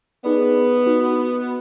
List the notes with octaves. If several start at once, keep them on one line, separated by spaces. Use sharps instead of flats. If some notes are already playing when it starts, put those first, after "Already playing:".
B3 D#4 G#4 B4 D5
D#4 F#4 B4